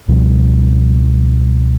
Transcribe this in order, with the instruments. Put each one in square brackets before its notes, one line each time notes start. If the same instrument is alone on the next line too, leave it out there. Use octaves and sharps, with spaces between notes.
[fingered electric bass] C#2 B2 F3 G3